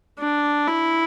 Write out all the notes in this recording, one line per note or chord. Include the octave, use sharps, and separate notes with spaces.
D4
E4